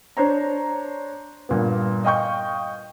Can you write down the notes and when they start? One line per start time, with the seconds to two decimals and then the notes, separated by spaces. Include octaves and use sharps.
0.17 D4 C5 C#5 A#5
1.49 G2 A#2 B3
2.05 D#5 F5 G5 C#6 G6